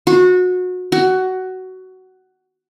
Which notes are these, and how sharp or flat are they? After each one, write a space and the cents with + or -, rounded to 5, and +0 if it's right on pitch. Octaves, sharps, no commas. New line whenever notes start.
F#4 -25
F#4 +15